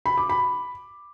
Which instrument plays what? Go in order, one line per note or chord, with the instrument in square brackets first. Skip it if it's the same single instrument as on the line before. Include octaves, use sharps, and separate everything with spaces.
[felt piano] B5
D6
B5